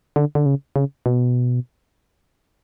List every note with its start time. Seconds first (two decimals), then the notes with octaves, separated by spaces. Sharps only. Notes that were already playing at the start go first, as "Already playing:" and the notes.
0.16 D3
0.35 D3
0.46 C#3
0.76 C#3
1.06 B2